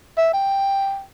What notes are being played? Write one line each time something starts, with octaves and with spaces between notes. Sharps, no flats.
E5
G5